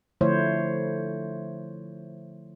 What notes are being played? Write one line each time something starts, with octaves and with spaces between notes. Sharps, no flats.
D3 F3 A3 E4 C5 C#5